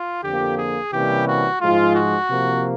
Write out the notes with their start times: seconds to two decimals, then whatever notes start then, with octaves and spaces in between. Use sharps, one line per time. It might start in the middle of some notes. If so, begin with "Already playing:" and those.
Already playing: F4
0.24 F2 D3 F3 A#3 G4
0.58 G#4
0.93 C3 E3 G3 A#3 C#4 G4
1.27 F#4
1.61 G#2 F3 G#3 F4
1.96 F#4
2.30 C3 F3 A#3